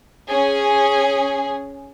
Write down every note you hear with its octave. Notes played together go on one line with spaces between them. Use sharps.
C#4 G#4